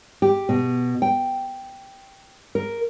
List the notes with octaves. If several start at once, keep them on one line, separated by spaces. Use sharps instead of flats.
G4
B2
G5
A#4